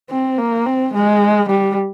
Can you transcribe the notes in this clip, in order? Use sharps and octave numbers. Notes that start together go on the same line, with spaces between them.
C4
A#3
C4
G#3
G3